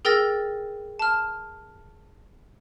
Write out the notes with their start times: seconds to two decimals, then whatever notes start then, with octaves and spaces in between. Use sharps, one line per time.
0.05 G#4 A#4 G5 E6 A6 A#6
0.99 A5 F6